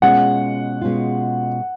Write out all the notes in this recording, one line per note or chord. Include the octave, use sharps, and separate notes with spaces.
B2 G#3 C#4 F4 F#5
B2 G#3 C#4 F4